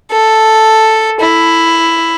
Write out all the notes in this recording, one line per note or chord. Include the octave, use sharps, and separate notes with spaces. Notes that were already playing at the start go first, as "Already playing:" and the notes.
A4
E4